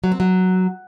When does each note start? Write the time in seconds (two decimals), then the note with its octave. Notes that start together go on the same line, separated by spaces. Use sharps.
0.04 F#3
0.12 C4
0.20 F#3